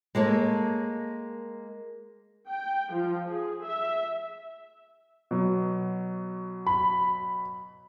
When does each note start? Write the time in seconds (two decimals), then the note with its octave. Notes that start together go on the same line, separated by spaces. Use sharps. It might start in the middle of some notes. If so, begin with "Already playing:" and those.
0.15 G#3 A#3 A4 C#5
2.48 G5
2.91 F3
3.27 G#4
3.63 E5
5.31 B2 F#3
6.67 B5